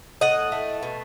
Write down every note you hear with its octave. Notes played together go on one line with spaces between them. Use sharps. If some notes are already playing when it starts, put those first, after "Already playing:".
A2 D#5 F#5
A3
B2